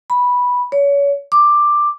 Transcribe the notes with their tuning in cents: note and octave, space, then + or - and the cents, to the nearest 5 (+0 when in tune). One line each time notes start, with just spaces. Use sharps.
B5 -10
C#5 +30
D6 +10